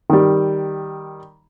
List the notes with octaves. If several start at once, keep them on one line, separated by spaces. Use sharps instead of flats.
D#3 G3